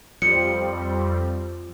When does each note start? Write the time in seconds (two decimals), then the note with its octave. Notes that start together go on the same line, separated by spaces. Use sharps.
0.22 F2 F3 G3 C4 C#7